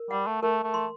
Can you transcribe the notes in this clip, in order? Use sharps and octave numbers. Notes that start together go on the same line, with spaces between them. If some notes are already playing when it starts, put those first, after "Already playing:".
Already playing: A#4
G3 F#5
A3
A3 A#4
A3
C6